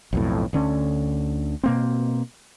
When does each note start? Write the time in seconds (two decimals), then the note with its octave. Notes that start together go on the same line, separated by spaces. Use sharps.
0.13 B1 F2 A2
0.53 D2 D3 C#4
1.64 B2 A#3 C4